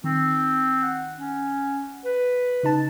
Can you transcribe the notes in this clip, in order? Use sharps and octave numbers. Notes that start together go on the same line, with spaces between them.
D#3 C4
F#5
C#4
B4
C#3 D#4 A5